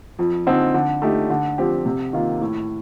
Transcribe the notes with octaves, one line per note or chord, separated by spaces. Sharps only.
F2
D3 F3 C4 D#4
D3
A3 D#4 G4
D3
F3 C4 G4
C3
D#3 A#3 F4
A2